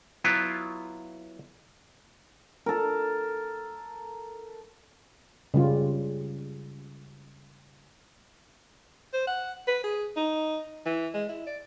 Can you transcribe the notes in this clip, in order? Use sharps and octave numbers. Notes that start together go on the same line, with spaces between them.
F#3 B3 E4 F4
A4 A#4
C#3 G3 F4
C5
F#5
B4
G#4
D#4
E3
G#3
E4
D5